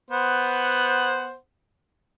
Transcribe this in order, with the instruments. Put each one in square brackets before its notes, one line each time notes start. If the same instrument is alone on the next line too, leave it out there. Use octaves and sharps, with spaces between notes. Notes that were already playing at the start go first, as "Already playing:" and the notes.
[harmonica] B3 C5 F#5